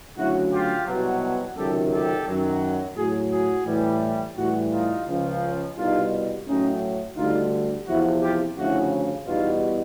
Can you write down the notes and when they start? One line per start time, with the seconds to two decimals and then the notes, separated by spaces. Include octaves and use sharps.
0.17 D2 C#3 F#3 E4 F#4
0.51 F4 G4
0.86 C2 B2 F#3
1.56 C#2 C3 D#3 F#3 G4 A4
1.92 G4 A4
2.27 F#2 D#3 F#3
2.97 A2 F#3 F#4 G#4
3.31 F#4 G#4
3.66 A2 E3 G3
4.36 A2 E3 G3 E4 F#4
4.71 D#4 F4
5.07 C#2 C#3 F3
5.76 C2 B2 G3 D#4 F4
6.47 A2 F#3 C#4 D#4
7.17 D2 D3 G3 D#4 F4
7.87 E2 C3 F3 E4 F#4
8.22 F4 G4
8.57 D2 C#3 F3 E4 F#4
9.27 E2 B2 G3 D#4 F4